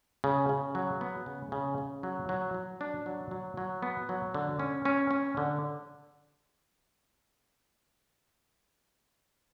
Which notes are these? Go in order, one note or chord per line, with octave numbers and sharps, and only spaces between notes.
C#3
C#3
F#3
B3
C#3
C#3
C#3
F#3
F#3
F#3
D4
F#3
F#3
F#3
B3
F#3
D3
C#4
C#4
C#4
D3